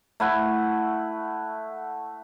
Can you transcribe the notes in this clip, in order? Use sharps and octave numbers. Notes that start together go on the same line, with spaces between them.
A3 E4 F#5